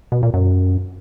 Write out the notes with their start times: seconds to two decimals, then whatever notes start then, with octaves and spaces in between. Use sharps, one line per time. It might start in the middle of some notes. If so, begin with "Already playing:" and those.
0.12 B2
0.23 A#2
0.34 F#2